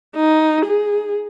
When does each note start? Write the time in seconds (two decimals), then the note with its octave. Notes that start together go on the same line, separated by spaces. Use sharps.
0.16 D#4
0.65 G#4